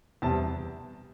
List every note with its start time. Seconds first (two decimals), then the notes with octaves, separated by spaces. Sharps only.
0.22 E2 C3 G3 A5